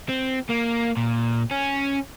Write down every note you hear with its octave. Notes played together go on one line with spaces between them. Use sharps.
C4
A#3
A#2
C#4